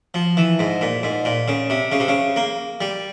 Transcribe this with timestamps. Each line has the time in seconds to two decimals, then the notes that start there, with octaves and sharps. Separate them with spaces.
0.14 F3
0.37 E3
0.59 G#2
0.81 A#2
1.03 G#2
1.25 A#2
1.48 C#3
1.70 C3
1.92 C#3
2.00 C3
2.08 C#3
2.36 A#3
2.81 G3